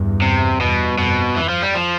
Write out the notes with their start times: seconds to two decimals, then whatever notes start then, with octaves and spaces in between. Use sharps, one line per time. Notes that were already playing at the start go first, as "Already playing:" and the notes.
Already playing: E2 G2
0.22 C3
0.60 E2 G2 B2
0.98 F2 B2
1.37 F2 E3
1.49 F3
1.62 G3
1.75 F3